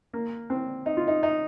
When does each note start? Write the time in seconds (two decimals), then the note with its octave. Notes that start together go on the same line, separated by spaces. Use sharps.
0.13 A#3
0.50 C4
0.86 D#4
0.97 F4
1.07 D#4
1.23 D#4